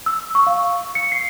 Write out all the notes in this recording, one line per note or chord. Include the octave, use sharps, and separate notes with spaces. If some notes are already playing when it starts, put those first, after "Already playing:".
E6
C#6
F5
C#7
C7